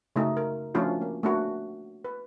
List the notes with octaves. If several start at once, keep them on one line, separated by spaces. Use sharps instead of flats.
C#3 A3 D#4 F#4
A#4
F3 A3 C#4 D4 F4 F#4
A#3
A3 A#3 D4 F#4
B4